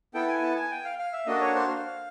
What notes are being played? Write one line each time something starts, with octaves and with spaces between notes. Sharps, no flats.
B3 E4 A4 G5
G#5
A5
G#5
G5
F5
F5
E5
A#3 D4 F#4 A4 D#5
C#5
C5
F5